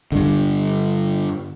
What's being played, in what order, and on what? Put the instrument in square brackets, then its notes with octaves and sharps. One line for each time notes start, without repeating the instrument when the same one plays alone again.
[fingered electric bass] G2 D3